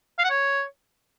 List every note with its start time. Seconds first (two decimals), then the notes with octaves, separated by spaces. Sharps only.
0.19 F5
0.24 F#5
0.30 C#5